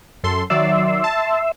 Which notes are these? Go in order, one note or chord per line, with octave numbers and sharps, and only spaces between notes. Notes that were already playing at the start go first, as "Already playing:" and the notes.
F#2 A4 C6
D#3 F#3 D5 E5 C6 E6
A5